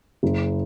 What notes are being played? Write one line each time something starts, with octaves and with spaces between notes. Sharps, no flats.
F#1